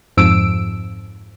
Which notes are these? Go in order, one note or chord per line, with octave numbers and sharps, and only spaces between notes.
F2 G#2 F3 E6 D7